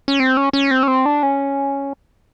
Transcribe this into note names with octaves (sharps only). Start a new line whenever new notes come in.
C#4
C4
C#4
C#4
C4
C#4
C4
D4
C#4